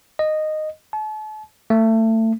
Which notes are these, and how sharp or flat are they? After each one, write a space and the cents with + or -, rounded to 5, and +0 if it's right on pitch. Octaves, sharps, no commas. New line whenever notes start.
D#5 -10
A5 -40
A3 +25